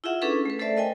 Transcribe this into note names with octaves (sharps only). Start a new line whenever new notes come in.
E4 F4 G#4 E5 F#5
C#4 D4 G#4 A4 B4
A3 B4
A3 A4 C5 D5 E5 A5
A#4 D#5 G5 G#5